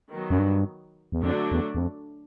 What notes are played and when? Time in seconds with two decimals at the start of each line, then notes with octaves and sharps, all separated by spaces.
0.10 D#3 F#3 B3
0.30 F#2
0.39 G2
1.12 E2
1.23 F2 D3 F#3 A3 D4 F#4
1.52 E2
1.75 E2
1.79 F2